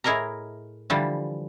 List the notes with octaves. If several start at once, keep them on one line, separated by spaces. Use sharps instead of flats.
A2 E4 G#4 A#4 D#5 A#5
D3 E3 F3 G3